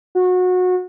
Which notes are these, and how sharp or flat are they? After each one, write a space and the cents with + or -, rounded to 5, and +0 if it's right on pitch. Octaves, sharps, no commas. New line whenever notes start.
F#4 -25